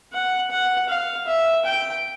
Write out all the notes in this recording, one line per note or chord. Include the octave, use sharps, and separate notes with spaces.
F#5
F#5
F5
E5
G5